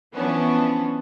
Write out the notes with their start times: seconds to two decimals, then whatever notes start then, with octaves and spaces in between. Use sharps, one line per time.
0.13 E3 F3 B3 C#4 D4